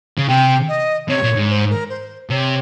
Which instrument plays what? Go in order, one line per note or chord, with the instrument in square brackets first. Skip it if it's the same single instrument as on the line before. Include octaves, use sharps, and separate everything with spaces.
[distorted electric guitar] C#3
[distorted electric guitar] C3 [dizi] G5
[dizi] D#5
[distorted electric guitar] C3 [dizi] C#5
[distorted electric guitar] A#2
G#2
[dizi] C5
A#4
C5
[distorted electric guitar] C3 [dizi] C#5